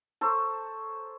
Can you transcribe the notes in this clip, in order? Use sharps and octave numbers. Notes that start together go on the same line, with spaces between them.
A4 C5 C#5 A#5